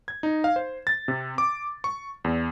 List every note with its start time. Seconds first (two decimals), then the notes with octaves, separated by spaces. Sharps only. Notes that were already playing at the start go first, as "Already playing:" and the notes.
0.08 G#6
0.23 D#4
0.44 F5
0.56 C5
0.87 A6
1.08 C3
1.38 D6
1.84 C#6
2.24 E2